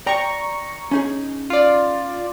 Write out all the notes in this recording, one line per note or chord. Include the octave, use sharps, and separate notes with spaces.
D5 G5 A#5 C#6
C#4 D#4 G#4
F4 D5